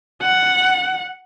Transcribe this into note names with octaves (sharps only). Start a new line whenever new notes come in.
F#5